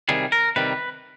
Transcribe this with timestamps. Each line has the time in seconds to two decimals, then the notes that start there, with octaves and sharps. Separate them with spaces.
0.09 C3 D#3 G3 G#4
0.32 A#4
0.56 C3 D#3 G3 B4